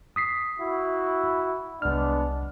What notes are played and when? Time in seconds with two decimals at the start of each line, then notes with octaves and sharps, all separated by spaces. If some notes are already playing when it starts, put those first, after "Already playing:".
0.16 D#6 B6 C7
0.60 E4 F#4
1.82 C2 G#3 B3 D4 F6